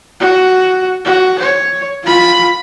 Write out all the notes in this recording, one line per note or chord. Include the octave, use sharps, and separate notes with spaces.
F#4
F#4
C#5
F4 B5